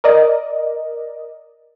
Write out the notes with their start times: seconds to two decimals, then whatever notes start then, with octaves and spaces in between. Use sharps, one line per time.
0.04 A#4 D5 D#5